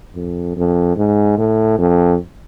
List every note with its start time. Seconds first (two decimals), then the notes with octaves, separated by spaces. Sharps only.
0.16 F2
0.57 F2
0.97 G#2
1.38 A2
1.79 F2